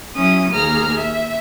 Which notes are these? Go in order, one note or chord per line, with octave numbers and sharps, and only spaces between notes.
F#3 C#4 E4 D#6
D#2 A#3 G#4 A#5 F6
E5